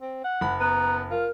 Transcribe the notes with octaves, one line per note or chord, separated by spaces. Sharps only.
C4
F#5
F#1 B5
B3 A#5
F4 A#4